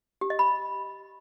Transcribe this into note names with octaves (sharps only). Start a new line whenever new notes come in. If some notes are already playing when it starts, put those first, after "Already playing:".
G4
D#5
B5